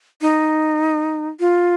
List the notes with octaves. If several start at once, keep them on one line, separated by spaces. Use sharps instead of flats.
D#4
F4